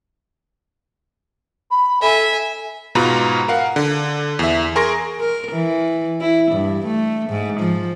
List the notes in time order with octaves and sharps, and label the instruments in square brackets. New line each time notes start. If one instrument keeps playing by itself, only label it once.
[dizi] B5
[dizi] A4 [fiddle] E5 G#5
[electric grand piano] G#2 B2 F4 B4 A#5 B5
A#4 F5 F#5
D3
E2 E5
G#4 A#4 C6 C#6 A#6 D7
[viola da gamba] A#4
E3
E4
G2
A3
G#2
F3